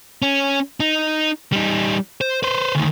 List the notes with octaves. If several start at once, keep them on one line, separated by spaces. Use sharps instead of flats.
C#4
D#4
G3 D#4
C5
B4 C5
D2 D#3